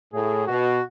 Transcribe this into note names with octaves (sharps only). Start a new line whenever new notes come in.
A2 G#4
B2 F#4